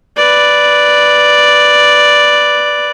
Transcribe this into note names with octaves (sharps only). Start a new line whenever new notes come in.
B4 D5